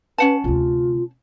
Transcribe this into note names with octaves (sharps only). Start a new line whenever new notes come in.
C#4 B4 F#5 A5
D2 C3 F4